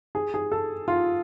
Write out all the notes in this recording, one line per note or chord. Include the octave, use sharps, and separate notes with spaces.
G#4
G#4
A4
F4